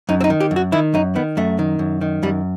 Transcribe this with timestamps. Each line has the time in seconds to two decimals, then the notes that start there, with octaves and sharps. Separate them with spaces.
0.09 F#2 D#4
0.21 C4
0.24 D#4
0.30 D#3
0.40 G4
0.51 F#2
0.56 F#4
0.72 D#3 E4
0.94 F#2 D#4
1.15 D#3 B3
1.37 F#2 A3
1.59 D#3
1.79 F#2
2.01 D#3
2.23 F#2 G3